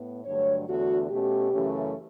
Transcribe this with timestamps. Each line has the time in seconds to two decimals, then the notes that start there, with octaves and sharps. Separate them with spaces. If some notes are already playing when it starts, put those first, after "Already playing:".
Already playing: A2 B3
0.25 G2 D3 F#3 A3 C#5
0.68 E2 D3 A3 F#4
1.10 B2 A3 C#4 G4
1.52 F#2 C#3 E3 A3 C#4